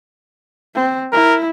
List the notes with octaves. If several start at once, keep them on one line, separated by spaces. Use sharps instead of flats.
C4
E4 A#4